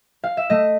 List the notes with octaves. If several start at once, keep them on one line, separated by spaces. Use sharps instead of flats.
F5
E5
A3 D#5